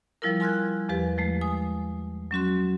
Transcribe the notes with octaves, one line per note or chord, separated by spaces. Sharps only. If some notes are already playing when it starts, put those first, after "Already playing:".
F3 G3 E4 F4 A#4
G#5 C6 F6 F#6 G#6
E2 F3 G4 B4
F3 G#3 A3
G#5 D#6
F#3 C#4 F#4 C6